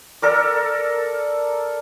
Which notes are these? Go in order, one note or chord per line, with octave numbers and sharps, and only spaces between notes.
A4 A#4 D5